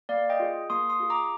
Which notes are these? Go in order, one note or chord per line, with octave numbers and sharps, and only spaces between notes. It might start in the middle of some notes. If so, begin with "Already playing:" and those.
A#3 D5 F5
D#5 G5
F4 G#4
A#3 C6 D#6
C6 D#6
F4 G#4
A#5 D6